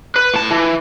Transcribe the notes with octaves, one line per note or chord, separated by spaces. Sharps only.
B4
A2 A5
E3